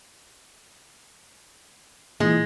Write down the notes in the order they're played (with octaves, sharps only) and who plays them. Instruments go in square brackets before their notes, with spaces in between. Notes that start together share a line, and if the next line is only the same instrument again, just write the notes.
[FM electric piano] A#2 E3 [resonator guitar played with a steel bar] G#3